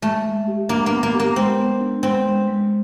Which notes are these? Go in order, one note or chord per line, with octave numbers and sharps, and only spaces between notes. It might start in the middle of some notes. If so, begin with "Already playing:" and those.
G#3 A3
G#3
G4
A#3 D4
A#3 B3
A#3
G4
A#3
G#3 C4
B3
D4
G#3 C4
G#3
G#3